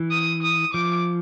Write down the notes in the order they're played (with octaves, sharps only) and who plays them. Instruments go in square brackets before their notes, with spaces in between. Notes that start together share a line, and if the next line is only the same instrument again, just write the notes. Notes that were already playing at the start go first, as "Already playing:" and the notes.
Already playing: [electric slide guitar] E3
[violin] D#6
D#6
[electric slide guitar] F3 [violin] D6